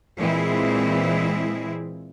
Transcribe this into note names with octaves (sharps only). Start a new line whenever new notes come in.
A#2 E3 G#3 C4 E4 G#4